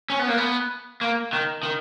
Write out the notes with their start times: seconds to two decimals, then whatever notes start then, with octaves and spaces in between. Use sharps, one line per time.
0.10 C#4
0.19 B3
0.28 A#3
0.38 B3
1.01 A#3
1.33 D#3
1.63 D#3